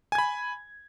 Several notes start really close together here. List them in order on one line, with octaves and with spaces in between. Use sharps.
G#5 G#6 B5